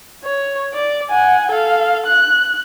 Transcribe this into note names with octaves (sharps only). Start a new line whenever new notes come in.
C#5
D5
F#5 G#5
A4 F5
F#6